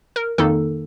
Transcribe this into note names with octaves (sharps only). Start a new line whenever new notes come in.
A#4
F2 D#3 A#3 D#4 A4